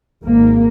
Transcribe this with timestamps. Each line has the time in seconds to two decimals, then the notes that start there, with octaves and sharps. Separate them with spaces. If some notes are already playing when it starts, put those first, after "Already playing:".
0.23 G#1 G#2 A#3